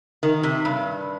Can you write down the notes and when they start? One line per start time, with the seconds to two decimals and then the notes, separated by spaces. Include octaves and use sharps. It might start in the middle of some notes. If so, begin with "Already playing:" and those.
0.23 D#3
0.43 C3
0.65 G2